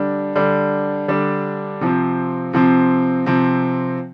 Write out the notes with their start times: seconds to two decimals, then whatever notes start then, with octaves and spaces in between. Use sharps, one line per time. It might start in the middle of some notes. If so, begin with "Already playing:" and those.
Already playing: D3 G3 D4
0.35 D3 G3 D4
1.08 D3 G3 D4
1.81 C3 F3 C4
2.53 C3 F3 C4
3.26 C3 F3 C4